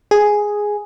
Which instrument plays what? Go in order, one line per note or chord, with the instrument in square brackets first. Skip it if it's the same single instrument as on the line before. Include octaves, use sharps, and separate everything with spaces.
[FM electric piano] G#4